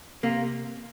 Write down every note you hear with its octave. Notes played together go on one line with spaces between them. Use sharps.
C3 A#3